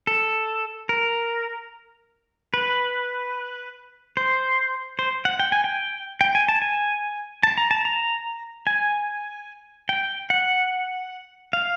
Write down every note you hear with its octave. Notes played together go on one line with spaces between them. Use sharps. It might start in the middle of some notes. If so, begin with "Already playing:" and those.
A4
A#4
B4
C5
C5
F#5
G5
G#5
G5
G5
G#5
A5
G#5
A5
A#5
A5
A#5
G#5
G5
F#5
F5